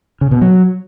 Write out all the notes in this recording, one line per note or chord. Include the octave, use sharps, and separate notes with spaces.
C#3
B2
F#3